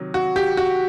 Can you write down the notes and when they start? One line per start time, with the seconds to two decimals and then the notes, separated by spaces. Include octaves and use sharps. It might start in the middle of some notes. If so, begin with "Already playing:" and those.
Already playing: C3 D#3 F#3
0.14 F#4
0.36 G4
0.57 F#4